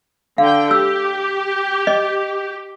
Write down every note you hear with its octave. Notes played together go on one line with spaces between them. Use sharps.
D3 F5 G5
G4 E6
D#5